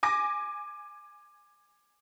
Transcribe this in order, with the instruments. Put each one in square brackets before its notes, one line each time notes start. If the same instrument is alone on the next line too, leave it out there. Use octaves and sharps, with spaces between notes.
[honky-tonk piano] G#5 D6 A#6